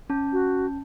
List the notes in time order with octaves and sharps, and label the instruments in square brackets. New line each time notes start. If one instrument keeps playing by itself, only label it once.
[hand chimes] C#4 A5 G6
[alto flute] F#4